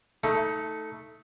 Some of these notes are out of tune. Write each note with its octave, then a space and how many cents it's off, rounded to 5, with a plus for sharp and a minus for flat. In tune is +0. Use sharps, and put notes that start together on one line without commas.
A3 +0 D#4 +25